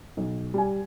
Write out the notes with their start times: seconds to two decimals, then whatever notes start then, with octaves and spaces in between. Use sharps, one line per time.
0.17 B1
0.54 G3 G#5